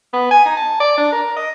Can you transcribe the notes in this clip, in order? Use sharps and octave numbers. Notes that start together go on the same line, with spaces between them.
B3
G#5
D#4
A5
D5
D4
A#4
D#5